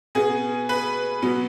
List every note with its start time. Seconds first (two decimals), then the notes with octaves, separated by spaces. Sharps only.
0.15 B2 B3 G#4
0.69 B4
1.22 B2 F#3 B3